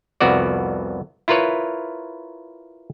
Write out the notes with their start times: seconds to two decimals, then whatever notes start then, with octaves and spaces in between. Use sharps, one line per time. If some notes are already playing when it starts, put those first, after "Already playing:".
0.21 C2 F2 B3 F#4 D5
1.28 E4 F4 A#4 B4 C#5